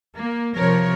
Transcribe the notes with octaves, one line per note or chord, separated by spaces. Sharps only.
A#3
C3 F3 A#4 C#5